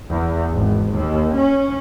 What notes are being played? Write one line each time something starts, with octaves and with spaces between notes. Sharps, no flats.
E2
G#1
D#2
C#4